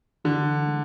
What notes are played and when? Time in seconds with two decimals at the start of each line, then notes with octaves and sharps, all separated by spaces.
0.25 D3 E3
0.68 G#3